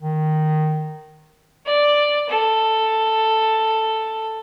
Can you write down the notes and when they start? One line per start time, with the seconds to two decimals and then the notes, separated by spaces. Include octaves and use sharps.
0.02 D#3
1.66 D5
2.29 A4